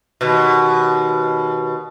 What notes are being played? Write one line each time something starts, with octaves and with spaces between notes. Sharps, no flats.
D#2 B2